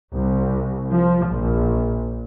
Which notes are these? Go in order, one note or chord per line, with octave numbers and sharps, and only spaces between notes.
C2
F3
A#1